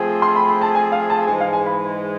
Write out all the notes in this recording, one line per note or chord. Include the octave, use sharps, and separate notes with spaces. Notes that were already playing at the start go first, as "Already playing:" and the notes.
Already playing: F3 A3 C4 G#4
C6
B5
B5
A5
G#5
F5
A5
G#2 E3 G#3 G#5
F5
G#5
B5